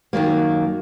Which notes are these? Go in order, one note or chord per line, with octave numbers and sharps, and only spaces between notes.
F#2 D#3 F#3 A#3